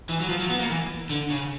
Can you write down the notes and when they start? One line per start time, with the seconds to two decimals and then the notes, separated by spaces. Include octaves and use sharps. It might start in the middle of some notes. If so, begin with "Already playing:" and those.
0.09 E3
0.20 F#3
0.29 F3
0.39 F#3
0.49 B3
0.59 A#3
0.70 E3
1.10 D3
1.30 C#3